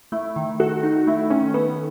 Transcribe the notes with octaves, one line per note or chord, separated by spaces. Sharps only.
A3 E4
D#3
F#4 A4
D#4
A3 E4
D#3 C#4
B3 A4